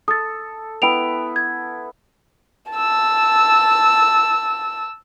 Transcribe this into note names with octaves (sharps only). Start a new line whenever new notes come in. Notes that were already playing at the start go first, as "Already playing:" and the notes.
A4 D#6 A6
B3 E4 B4 G5 D7 F7
G#6
A5 E6